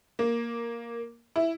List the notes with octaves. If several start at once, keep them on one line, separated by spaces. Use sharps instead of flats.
A#3
E4